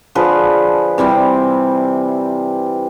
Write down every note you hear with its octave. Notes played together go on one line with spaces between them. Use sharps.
D3 F3 G#4 B4
C3 E3 G3 C4